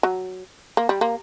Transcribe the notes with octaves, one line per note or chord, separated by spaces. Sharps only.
F#3
A#3
G3
A#3